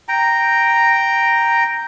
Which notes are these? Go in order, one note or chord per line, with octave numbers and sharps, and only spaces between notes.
G5 A#5